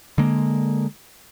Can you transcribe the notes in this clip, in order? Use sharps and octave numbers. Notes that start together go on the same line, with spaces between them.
D3 G#3 A#3